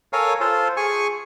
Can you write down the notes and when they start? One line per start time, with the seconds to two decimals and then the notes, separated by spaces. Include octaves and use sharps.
0.13 A4 A#4 C#5 F5 G#5
0.40 F4 A4 C5
0.77 G#4 G#5 C#6